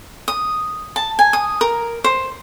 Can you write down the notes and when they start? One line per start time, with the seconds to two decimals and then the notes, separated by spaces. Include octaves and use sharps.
0.28 D#6
0.96 A5
1.19 G#5
1.33 D#6
1.61 A#4
2.04 C5